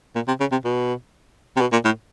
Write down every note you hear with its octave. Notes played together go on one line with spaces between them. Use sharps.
A#2
C3
C#3
C3
B2
C3
B2
A#2
A2